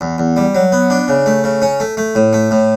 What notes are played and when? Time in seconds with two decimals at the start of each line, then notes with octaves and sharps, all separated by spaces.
0.01 E2
0.18 E2
0.37 G3
0.55 F#3
0.72 B3
0.90 D4
1.08 C#3
1.26 A3
1.44 C#3
1.62 C#4
1.80 A3
1.97 A3
2.15 A2
2.33 A3
2.51 A2